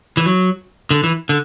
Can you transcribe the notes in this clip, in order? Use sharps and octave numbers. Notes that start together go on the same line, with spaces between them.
E3
F#3
D3
E3
D3